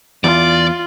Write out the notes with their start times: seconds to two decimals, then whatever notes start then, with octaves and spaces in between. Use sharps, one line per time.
0.24 E2 F4 D5